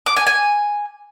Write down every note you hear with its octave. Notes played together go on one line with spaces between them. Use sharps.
D6
G#5
G#5